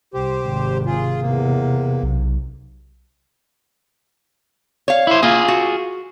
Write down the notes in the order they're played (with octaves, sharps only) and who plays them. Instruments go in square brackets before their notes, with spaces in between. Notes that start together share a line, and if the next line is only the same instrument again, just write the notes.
[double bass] C2 [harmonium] G4 C5
[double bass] G#1 C3
[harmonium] F4 G#4
[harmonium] E2 A#3 [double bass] C3
[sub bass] B1
[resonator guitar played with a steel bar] C#5 F5
[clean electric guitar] E4 C5
[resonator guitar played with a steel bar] A#3 [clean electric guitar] F4 G#4
[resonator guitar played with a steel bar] F#4